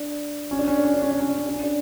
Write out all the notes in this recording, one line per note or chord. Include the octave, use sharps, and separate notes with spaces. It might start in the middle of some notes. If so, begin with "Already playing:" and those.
Already playing: D4
C#4
D4
C#4
D4
C#4
D4
C#4
D4
C#4
D4
C#4
D4
C#4
D4